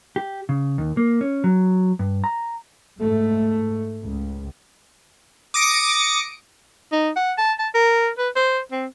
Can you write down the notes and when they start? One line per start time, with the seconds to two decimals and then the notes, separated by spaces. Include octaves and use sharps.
0.16 G4
0.49 C#3
0.78 D#2
0.97 A#3
1.21 C#4
1.44 F#3
1.99 G2
2.24 A#5
2.99 G#2 A3
4.04 C#2
5.54 D6 D#6 A#6 C#7 D7
6.92 D#4
7.16 F#5
7.38 A5
7.59 A5
7.75 A#4
8.18 B4
8.36 C5
8.72 C4